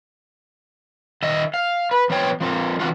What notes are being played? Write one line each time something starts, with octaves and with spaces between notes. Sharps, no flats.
D#3 D#5 E5
F5
B4
F3 B3 C#5 G5
F3 C4 A#4
E3 C4 D4 F4 F#4